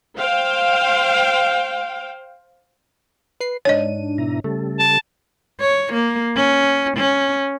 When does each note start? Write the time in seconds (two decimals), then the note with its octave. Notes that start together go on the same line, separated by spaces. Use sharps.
0.17 C5 F5 G5
3.40 B4 C7
3.65 G#2 D4 C#5 D#5 D#7
4.18 B2 E4 A#5
4.44 C#3 G3 A3 A4
4.79 A5
5.61 C#5
5.93 A#3
6.36 C#4
6.97 C#4